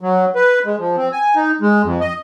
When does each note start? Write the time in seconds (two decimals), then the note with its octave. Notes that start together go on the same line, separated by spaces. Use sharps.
0.01 F#3
0.35 B4
0.65 G#3
0.79 F3
0.97 C4
1.12 G#5
1.35 D#4
1.61 G#3
1.84 F2
2.01 D#5